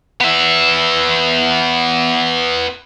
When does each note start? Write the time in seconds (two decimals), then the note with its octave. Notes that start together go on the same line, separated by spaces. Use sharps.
0.21 B3 E5